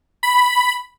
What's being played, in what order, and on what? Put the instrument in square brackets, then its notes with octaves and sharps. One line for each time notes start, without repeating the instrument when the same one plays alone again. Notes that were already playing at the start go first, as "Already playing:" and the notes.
[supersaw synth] B5